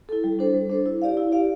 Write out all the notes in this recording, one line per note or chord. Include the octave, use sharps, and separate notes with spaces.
E4 A4
G3
D4 A4 C5
G3
D4 A4 C5
E4
G4 D5 F5
E4
G4 D5 F5